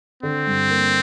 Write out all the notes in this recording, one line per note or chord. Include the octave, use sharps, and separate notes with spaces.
D3 C4
G2
A#3